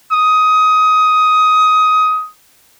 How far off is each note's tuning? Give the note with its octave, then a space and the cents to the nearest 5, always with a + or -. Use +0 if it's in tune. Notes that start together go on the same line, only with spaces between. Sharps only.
D#6 +15